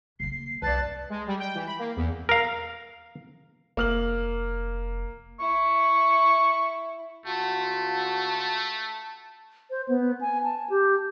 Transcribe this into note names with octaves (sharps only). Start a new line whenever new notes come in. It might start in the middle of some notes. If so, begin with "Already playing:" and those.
C#3 A#3 C7
C2 F#2 B4 D5 A5 F#6
G#3
G3
G5
E3
B5
A#3
E2
A#4 F5
F1 A#3 F6 F#7
E4 C#6
C#2 A3 F4 F#4 A5
C5
B3
G#5
A5
G4